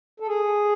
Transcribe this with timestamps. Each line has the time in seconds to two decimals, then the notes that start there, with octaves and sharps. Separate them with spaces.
0.20 A4
0.28 G#4